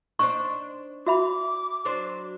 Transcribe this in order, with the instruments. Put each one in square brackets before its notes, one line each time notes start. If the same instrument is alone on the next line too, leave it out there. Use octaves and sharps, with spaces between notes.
[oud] D4 D#4 C5 [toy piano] C#6
[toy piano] F#4 E5 B5 [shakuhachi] D6
[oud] F#3 D4 C5